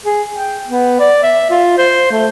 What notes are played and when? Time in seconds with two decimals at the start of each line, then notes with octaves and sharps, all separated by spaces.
0.05 G#4
0.33 G5
0.66 B3
1.00 D5
1.23 E5
1.51 F4
1.78 C5
2.11 A3